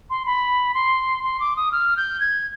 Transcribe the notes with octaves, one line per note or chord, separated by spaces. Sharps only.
C6
B5
C6
C6
D6
D#6
F6
G6
G#6